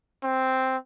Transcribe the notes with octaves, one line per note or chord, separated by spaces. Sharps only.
C4